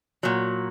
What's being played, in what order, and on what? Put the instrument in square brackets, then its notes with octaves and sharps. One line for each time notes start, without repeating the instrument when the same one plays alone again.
[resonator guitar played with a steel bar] A#2 F#3